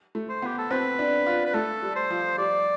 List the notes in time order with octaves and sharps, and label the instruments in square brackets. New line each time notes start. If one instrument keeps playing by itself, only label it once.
[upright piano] A3
[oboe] C5
[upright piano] B3
[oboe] G4
A4
[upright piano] C4 [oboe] B4
[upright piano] D4
F4
[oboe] B4
[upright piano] A3 [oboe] A4
[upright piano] G3
[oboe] C5
[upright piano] F3
[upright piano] G3 [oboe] D5